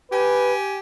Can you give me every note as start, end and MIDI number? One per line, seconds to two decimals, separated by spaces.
0.11 0.79 67
0.11 0.53 71
0.11 0.79 80